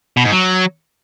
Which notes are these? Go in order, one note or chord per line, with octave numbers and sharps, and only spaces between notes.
B2
G#2
F#3